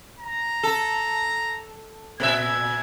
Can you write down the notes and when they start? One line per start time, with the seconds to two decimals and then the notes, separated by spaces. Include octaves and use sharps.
0.19 A#5
0.63 A4
2.20 A#2 A#4 E5 G#6